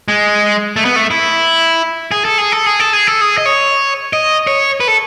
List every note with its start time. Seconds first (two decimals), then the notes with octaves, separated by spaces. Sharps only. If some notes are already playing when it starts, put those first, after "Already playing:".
0.08 G#3
0.76 A3
0.85 B3
0.96 A3
1.11 E4
2.11 G#4
2.25 A4
2.38 G#4
2.52 A4
2.66 G#4
2.80 A4
2.93 G#4
3.07 A4
3.21 G#4
3.38 D#5
3.46 C#5
4.13 D#5
4.47 C#5
4.80 B4
4.88 A4